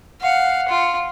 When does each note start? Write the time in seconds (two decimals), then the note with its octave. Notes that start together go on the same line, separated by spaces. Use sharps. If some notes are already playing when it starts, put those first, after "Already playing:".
0.22 F5 F#5
0.69 F4